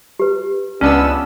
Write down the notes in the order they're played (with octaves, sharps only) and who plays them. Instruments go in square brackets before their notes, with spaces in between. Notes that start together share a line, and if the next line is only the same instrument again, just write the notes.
[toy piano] G4 B4
[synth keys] C#2 B3 E6 [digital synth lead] C#4 [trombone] D4